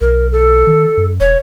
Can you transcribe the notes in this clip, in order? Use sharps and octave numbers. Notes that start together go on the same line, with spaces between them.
B1 A#4
A4
D#3
F#2
E1 C#5